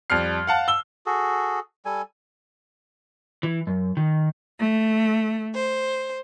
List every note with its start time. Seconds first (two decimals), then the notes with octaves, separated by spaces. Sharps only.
0.10 F2 G3 F6 C7
0.47 F5 F#5 A5
0.68 E6 G7
1.06 F#4 G#4 A4
1.85 G3 A4 G#5
3.43 E3
3.67 F#2
3.97 D#3
4.58 A3
5.54 C5